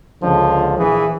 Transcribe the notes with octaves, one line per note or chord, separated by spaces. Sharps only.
C#2 D3 F3
A#1 E3 G#4